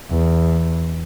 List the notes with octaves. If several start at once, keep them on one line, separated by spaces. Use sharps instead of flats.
E2